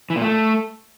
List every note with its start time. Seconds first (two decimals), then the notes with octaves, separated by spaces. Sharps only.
0.10 E3
0.16 A#2
0.22 A3